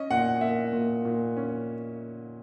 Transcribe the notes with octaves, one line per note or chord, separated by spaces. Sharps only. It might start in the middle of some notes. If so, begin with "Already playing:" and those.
Already playing: C#4 D#5
A#2 F#5
A#3 E5
A#2
A#2
C#4